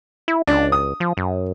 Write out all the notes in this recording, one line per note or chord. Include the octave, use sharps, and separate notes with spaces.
E4
C#2 D4
D#6
F3
F#2